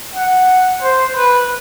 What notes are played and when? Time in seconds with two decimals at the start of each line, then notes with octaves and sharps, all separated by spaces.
0.15 F#5
0.82 C5
1.15 B4